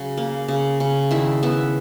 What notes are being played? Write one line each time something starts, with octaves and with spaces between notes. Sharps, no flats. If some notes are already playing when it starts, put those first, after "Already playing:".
Already playing: C#3 F#3
A#3
C#3
C#3
D#3 E4 E5
B3 E4 E5